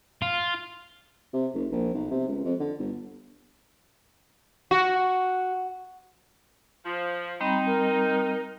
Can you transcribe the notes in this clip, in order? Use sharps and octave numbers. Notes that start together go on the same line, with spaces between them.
F4
C3
F#1
A#1
B1
C3
C#2
F2
D3
G1
F#4
F3
G3 C4 D#4 A#5 B5
A#4